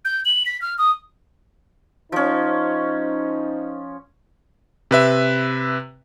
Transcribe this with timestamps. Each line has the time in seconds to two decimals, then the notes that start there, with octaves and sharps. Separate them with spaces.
0.05 G6
0.25 F#7
0.46 B6
0.62 F6
0.78 D#6
2.12 F3 C#4 D#4 C5
4.91 C3 B4 E5